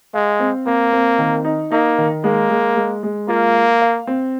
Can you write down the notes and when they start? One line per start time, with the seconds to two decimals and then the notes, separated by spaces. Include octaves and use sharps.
0.14 G#3 F5
0.40 C4
0.67 A#3 C4
0.93 C4
1.18 D#3
1.45 D#4
1.72 A#3 D#4
1.98 D#3
2.24 G#3 A#3
2.50 G#3
2.77 G#3
3.03 G#3
3.28 A#3 F4
3.55 F5
3.82 F5
4.07 C4